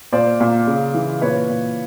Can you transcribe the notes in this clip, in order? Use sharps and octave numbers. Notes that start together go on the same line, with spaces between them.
A#2 C5 D5
A#2
C#3
E3
A#2 B4 C#5
A#2